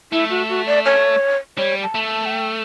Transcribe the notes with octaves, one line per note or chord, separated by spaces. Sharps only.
A3 E4
F#4
F#4
D5
C#5
G3 C#5
A5
A3
A5
F#5
G5